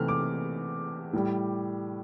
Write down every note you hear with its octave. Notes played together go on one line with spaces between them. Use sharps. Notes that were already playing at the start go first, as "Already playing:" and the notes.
Already playing: C3 E3 A3 F6
D6
A2 G3